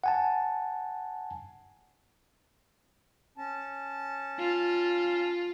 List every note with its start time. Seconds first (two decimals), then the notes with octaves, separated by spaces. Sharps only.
0.04 F#5 G#5 A5
3.38 C#4 A5
4.39 F4